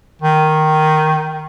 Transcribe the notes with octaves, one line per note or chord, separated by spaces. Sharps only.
D#3